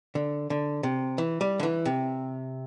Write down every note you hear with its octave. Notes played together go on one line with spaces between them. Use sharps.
D3
D3
C3
E3
G3
D3
E3
C3